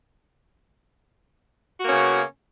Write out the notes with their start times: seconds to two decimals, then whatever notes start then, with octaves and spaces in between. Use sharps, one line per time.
1.80 F#4
1.83 A#3
1.86 C#4
1.88 B3
1.91 C#3